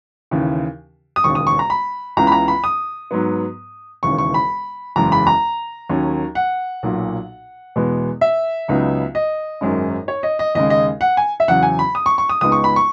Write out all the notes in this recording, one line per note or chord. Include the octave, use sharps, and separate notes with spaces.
D#2 C#3 E3
D#6
E1 D#2 C#3 C#6
D#6
C#6
A#5
B5
C#2 C#3 E3 B3 A#5
B5
A#5
B5
D#6
G#2 F#3 B3
E1 D#2 C#3 E3 C#6
C#6
B5
F#1 E2 C#3 G#3 A#5
B5
A#5
D#2 D#3 F#3 C#4
F#5
B1 A#2 F#3
E2 B2 G#3 B3
E5
C#2 C#3 F#3 B3 D#4
D#5
G#1 F#2 D#3 G#3 C#4
C#5
D#5
D#5
D#2 C#3 G#3 D#5
D#5
F#5
G#5
E5
E2 C#3 F#3 F#5
G#5
B5
D#6
C#6
C#6
D#6
C#2 C#3 G#3 B3 D#4 D#6
C#6
B5
C#6